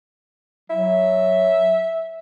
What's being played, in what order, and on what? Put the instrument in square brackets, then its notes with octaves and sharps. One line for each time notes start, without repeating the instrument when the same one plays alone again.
[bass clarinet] F#3 [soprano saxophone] E5